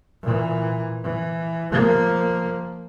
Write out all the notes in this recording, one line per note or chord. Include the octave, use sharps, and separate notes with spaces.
A#2 E3
E3
F3 A#3